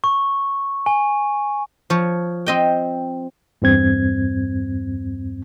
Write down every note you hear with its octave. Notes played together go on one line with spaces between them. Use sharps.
C#6
G#5
F3 C#5
C4 D#5 G5
E2 G2 C4 G#6